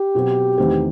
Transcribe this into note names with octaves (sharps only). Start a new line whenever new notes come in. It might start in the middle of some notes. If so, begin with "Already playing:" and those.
Already playing: G4
B2 F#3 C4 F#4
E2 D#3 A3 C4